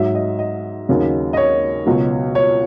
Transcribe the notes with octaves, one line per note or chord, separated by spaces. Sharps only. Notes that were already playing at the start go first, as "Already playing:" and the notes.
Already playing: G#2 F#3 E5
D#5
D#5
D#2 C#3 F#3
D#5
C#5
C#2 B2 F#3
C#5